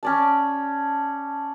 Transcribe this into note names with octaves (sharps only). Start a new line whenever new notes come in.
C#4 D5 A5